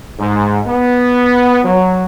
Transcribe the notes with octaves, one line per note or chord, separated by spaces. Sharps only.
G#2
B3
F#3